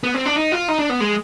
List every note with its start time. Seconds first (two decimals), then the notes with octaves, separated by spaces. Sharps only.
0.03 B3
0.14 C4
0.25 D4
0.36 D#4
0.52 F4
0.68 D#4
0.79 D4
0.90 B3
1.00 G#3